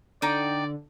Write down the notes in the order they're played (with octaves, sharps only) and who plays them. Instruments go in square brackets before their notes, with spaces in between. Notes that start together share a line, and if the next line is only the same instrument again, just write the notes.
[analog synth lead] D3 [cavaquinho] D#4 G5 [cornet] D5